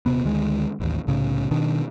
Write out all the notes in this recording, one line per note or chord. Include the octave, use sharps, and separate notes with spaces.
D#1 C3 B3
D2 D#3 G#3
A1 D#2
C2 A2 C#3
B2 D#3 D4